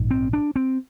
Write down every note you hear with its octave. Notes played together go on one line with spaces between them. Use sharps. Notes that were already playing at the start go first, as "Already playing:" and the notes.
Already playing: A#1 G#2
C4
D4
C4